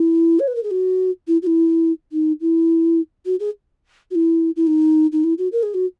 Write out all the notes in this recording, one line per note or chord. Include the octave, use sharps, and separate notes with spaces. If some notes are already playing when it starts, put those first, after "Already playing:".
Already playing: E4
C#5
B4
A#4
G#4
F#4
E4
F#4
E4
D#4
E4
F#4
G#4
F#4
E4
E4
D#4
D#4
E4
F#4
A#4
G#4
F#4